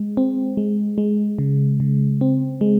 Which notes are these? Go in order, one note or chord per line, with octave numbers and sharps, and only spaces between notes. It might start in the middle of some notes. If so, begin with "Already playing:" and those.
Already playing: G#3
C4
G#3
G#3
C#3
C#3
C4
G#3